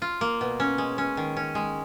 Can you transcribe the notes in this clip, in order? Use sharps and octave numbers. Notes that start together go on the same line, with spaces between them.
F4
A#3
B2
C#4
G#3
C#4
D#3
C#4
G#3